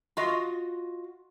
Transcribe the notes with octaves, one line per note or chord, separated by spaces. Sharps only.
F4 F#4 D#5